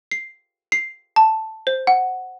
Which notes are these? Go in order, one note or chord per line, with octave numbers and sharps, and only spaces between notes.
C7
C7
A5
C5
F#5